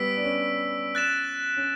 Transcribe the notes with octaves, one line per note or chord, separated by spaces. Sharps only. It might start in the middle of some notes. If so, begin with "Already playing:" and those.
Already playing: G3 B3 E6 B6 D7
D4
C#4
F#6 A6 E7
C#4